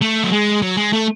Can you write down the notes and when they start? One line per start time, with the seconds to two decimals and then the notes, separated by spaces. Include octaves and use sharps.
0.01 A3
0.24 F#3
0.32 G#3
0.62 F#3
0.77 G#3
0.93 A3